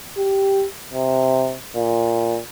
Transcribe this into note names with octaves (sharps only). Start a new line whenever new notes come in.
G4
C3
A#2